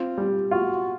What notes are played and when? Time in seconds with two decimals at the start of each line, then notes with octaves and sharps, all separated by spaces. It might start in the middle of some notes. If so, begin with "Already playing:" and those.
Already playing: C4 F4
0.18 G3
0.51 F4 F#4